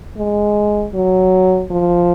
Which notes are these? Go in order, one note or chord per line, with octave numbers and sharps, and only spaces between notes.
G#3
F#3
F3